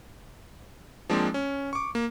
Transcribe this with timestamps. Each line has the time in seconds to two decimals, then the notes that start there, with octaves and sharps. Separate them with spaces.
1.10 F3 G#3 A#3 C4 D4
1.34 C#4
1.73 C#6 D6
1.95 A#3